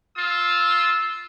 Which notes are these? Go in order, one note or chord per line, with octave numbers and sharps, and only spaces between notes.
F4 E6